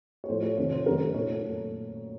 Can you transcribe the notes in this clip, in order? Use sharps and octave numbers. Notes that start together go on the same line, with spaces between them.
C#5
A2 F3 A3 C5
C#5
F2 C3 D#3 C#5
C5
F#2 D#3 F#3 A3 A#4
A#2 A3 C#5